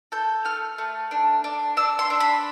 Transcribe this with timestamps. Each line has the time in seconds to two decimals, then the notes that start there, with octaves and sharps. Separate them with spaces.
0.12 A4 G6
0.45 A3 F6
0.78 A3
1.11 D4
1.44 D4
1.77 D4 E6
1.99 C6
2.10 D4
2.20 B5